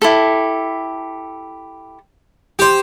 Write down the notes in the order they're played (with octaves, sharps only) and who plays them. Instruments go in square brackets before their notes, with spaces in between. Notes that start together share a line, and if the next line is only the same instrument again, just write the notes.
[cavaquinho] E4 G4 A4
[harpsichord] G4 C5